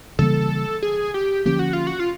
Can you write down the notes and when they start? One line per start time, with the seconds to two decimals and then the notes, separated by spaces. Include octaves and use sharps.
0.19 C#3 E3 G3 A#3 A4
0.83 G#4
1.14 G4
1.45 D3 F3 A#3 C#4 G4
1.59 F#4
1.73 F4
1.87 F#4
2.00 F4